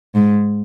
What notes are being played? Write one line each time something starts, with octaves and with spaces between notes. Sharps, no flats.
G#2